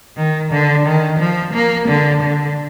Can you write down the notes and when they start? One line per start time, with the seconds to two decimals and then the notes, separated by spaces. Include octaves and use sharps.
0.17 D#3
0.51 D3
0.85 D#3
1.19 F3
1.53 A#3
1.88 D3
2.22 D3